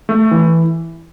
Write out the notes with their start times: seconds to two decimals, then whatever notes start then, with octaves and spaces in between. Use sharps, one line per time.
0.09 A3
0.31 E3